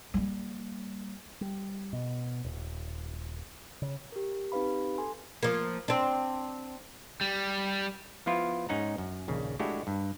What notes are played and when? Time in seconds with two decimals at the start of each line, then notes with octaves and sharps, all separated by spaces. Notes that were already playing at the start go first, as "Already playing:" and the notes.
0.14 G3 A#3
1.41 G3
1.93 B2
2.44 D#1
3.82 C#3
4.12 G4 A#4
4.52 C4 D#4 G4 B4 F5 B5
4.98 A4 G#5 C6
5.43 F3 A#3
5.88 C4 D4
7.21 G3
8.26 F3 B3 E4 F4
8.69 G#2 C#4 D#4 F#5 A#5
8.98 F#2
9.28 A#1 D#2 C#3
9.59 G#3 A3 D4 E4 F#4 G4
9.87 G2